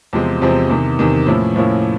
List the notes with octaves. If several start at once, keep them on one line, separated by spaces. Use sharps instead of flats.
E2 C3 F3 G#3 C4
E2 C3 F3 G#3 C4
E2 C3 D#3
E2 C3 D#3
A2 F3 A#3 C#4 E4
A2 F3 A#3 C#4 E4